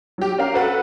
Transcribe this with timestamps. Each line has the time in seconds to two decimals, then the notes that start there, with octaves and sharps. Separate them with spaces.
0.18 F#3 G4
0.38 C#4 A#4 F5
0.53 F#4 A4 B4 F#5